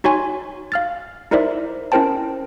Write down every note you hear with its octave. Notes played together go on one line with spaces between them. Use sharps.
D#4 F#4 C#5 G#5 C6
F5 F6 A6
D#4 E4 A#4 C5 D5 E5
C#4 E4 A#4 C5 G5 A5